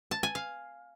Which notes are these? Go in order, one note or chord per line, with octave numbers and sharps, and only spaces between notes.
A5
G#5
F5